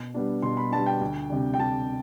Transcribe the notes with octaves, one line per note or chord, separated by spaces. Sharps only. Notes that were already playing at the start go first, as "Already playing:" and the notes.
Already playing: B2
G3 B3 D4
B2 C6
B5
G3 B3 D4 A5
G5
D2
C3 G3 D4
G5
D2 A5